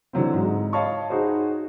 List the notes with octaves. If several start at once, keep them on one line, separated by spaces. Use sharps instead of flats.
D3 E3 F#3 C4
G#2 G#3
C#5 D#5 F5 A5 B5 C#6
D#4 F#4 G#4 C5